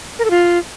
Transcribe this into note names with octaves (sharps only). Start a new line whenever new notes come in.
A#4
A4
F4